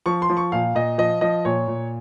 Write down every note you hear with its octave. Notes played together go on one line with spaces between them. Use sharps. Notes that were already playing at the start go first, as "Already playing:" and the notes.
F3 C#6
C6
F3
C#6
A#2 F5
A#2 D#5
F3 D#5
F3 D#5
A#2 C#5
A#2